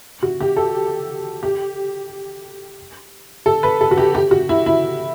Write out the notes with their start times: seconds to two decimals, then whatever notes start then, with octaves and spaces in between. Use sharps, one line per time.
0.23 F#4
0.40 G4
0.57 A4
1.43 G4
3.46 A4
3.63 B4
3.81 A4
3.91 F#4
3.98 G4
4.15 G4
4.31 F#4
4.49 E4
4.66 E4